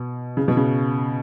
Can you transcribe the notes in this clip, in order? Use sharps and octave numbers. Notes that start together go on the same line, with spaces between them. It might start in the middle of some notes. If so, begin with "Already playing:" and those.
Already playing: B2
C#3
B2
C#3